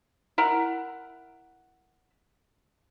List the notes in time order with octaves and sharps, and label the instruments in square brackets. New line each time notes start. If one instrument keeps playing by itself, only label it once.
[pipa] E4 A#4 F#5